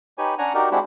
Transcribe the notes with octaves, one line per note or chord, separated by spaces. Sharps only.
D#4 G4 B4 C#5 G#5
C#4 D4 C#5 F#5 G#5 A#5
D#4 F#4 G4 A#4 D5
G#3 C4 D4 E4 F#4 G4